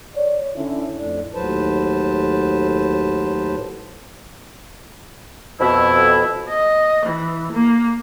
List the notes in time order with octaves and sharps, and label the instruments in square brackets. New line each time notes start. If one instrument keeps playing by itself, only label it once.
[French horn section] C#5 D5
D3 C#4 E4
[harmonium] F2 A2 D4
D#2 A2 F#3 B4 C5 A5
[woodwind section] F2 B2 E4
[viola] D#5
E3
A#3